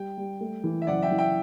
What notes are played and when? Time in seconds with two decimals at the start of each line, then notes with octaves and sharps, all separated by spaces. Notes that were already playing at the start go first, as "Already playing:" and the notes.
Already playing: G3 G5
0.18 G3
0.41 A3
0.64 E3
0.82 E5
0.87 F#1 D5 F#5
1.02 E5 G5
1.11 E3
1.18 E5 G5